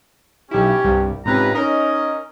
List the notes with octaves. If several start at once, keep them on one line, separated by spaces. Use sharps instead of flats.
B1 C#4 E4 G4
C2 G2
G#2 C3 C#4 F4 B4 A#5
C#4 D#4 A#4 D#5